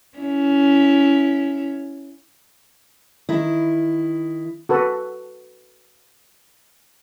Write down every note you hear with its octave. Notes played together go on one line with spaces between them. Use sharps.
C#4 E4
D#3 E4
F#4 A4 B4